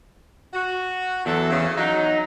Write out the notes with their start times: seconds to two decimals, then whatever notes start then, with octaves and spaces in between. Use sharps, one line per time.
0.54 F#4
1.26 E2 F#3 A4 E5
1.51 C#3
1.77 F#3 D#4